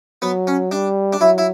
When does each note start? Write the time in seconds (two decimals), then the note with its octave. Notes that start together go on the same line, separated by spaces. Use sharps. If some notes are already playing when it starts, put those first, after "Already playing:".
0.22 F#3 B3
0.47 C#4
0.71 G3 D4
1.13 D4
1.20 F#3 E4
1.38 E4